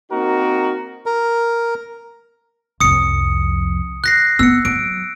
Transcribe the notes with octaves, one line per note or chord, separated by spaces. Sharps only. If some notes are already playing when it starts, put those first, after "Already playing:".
A#3 C4 D#4 F#4 A#4
A#4
C2 F2 D#6 C#7
F#6 A#6 C7
B3 E6 C#7
F#3 D7